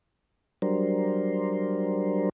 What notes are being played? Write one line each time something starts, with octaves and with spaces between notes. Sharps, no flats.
F#3 G3 D4 A#4 C5